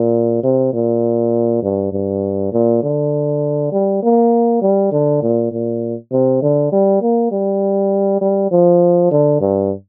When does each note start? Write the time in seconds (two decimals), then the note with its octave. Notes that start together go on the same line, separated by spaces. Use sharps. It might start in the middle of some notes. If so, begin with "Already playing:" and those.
Already playing: A#2
0.43 C3
0.73 A#2
1.63 G2
1.92 G2
2.53 A#2
2.83 D3
3.72 G3
4.02 A#3
4.62 G3
4.92 D3
5.22 A#2
5.52 A#2
6.12 C3
6.42 D3
6.72 G3
7.02 A#3
7.31 G3
8.21 G3
8.51 F3
9.11 D3
9.41 G2